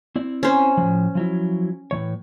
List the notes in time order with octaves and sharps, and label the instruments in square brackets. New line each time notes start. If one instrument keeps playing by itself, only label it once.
[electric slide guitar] C4 E4 D5
[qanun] C#4 C5
[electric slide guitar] A2 F3
F3 F#3 E4
A2 E3 C#5